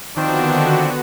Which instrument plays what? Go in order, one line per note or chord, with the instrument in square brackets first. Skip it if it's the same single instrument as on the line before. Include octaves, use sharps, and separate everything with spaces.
[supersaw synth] D3 B3 F#4 [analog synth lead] D#3 [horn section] F3 C4 D4